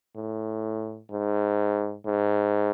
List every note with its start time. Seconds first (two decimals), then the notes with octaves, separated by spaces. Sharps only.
0.16 A2
1.11 G#2
2.06 G#2